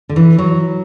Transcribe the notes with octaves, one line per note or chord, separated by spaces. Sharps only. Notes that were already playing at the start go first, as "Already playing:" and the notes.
D3
E3
F#3